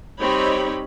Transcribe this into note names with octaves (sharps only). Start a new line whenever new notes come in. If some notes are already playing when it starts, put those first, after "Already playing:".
G3 C4 D#4 G4 C#5 B5